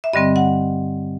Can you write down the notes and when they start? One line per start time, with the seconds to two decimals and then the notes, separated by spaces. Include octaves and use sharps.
0.04 E5
0.13 G2 D3 G3 C4 D#5
0.36 F#5